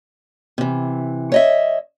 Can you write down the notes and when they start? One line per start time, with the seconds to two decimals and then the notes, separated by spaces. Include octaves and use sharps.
0.58 C3 E3
1.32 C#5 D#5 E5